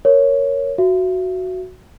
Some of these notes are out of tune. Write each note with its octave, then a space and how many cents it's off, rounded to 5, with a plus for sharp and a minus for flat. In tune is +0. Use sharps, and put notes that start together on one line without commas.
A#4 +0 C#5 +0
F#4 +0 E5 +35